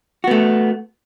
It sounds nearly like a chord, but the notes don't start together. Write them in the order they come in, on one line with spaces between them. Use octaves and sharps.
F#4 B3 A3